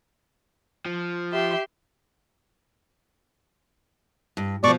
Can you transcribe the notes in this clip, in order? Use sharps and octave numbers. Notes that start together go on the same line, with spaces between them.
F3
G4 E5 C6
G2
B2 F3 D5 C#6 D6